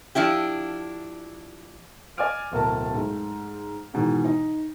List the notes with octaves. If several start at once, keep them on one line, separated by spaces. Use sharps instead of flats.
F3 D4 E4 G4
D5 D#5 G#5 D6 F6 D7
D1 B2 A#4 A5
G#2
G#2 B2 D#3 E3
D#4